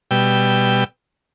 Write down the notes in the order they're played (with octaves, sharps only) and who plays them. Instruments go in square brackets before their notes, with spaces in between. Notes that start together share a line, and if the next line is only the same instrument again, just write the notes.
[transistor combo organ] B2 G3 G5 E6